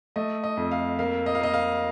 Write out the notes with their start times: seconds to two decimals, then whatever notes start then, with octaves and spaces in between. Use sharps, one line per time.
0.16 A3 D#5
0.44 D#5
0.57 F2
0.71 F5
0.99 A#3 F5
1.26 D#5
1.35 F5
1.40 A#3 D#5
1.54 F5